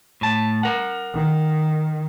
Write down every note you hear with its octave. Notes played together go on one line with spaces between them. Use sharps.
A2 A5
A#4 F#5
D#3